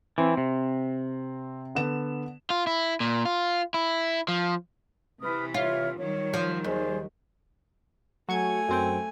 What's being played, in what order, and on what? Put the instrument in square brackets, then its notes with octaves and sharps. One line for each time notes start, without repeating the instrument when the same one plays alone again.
[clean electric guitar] E3 [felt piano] C4
[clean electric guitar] C3
[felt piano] D3 B3 E7
[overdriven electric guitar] F4
E4
A#2
F4
E4
F3
[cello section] C3 E3 [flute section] B4 D#6 F6
[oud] F4 [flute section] C#5 E5 F6
[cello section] D#3 F#3 G3 [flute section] C#5
[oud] F3
[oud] D#2 [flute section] G#4 C5 D5
[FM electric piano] F#3 C#6 G#6 [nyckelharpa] A3 G#5
[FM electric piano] F#2 C4 G5